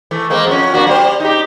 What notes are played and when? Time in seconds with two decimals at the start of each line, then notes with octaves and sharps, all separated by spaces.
0.11 E3 A3
0.30 G#3 A#3 C4
0.47 F2 C#4
0.74 A#3 D4 F#4
0.87 G3 C5
1.20 D#4 G4